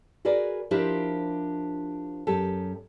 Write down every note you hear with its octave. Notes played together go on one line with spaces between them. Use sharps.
F#4 G#4 A#4 B4 D5
F3 D4 E4 G4 A#4 C5
F#2 G4 A4